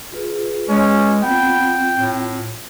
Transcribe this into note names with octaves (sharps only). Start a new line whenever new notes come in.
F4 G#4 B4
G#3 C#4
B3 C4 F4 G5
A2